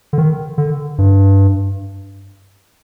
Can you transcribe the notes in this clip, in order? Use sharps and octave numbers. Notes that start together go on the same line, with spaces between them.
D3
D#3
D3
G2